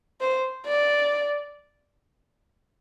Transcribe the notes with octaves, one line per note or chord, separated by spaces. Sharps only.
C5
D5